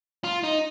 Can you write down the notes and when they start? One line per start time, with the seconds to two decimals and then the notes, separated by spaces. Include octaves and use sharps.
0.24 F4
0.43 D#4